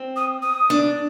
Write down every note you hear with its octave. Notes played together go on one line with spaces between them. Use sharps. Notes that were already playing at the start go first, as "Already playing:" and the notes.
Already playing: C4
D#6
D#6
D4